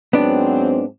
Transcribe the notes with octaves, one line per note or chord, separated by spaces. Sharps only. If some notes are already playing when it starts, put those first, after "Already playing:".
G#2 F#3 B3 C4 D4